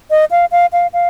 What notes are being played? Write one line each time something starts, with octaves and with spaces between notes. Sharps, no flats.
D#5
F5
F5
F5
F5